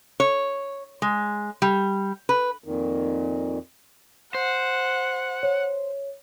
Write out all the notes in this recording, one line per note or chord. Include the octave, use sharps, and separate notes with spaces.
C#5
G#3
G3
B4
F2 A#2 D#3
C5 F#5
C#5